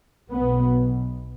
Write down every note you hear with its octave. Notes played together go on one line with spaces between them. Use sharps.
B1 B2 B3